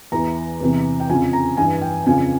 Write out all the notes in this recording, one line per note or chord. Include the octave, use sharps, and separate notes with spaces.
E2 E3 A#5
E2 C3 E3
G5
F2 C#3 F3 G#5
A#5
G2 E3 G#5
G5
F2 C#3 F3 G#5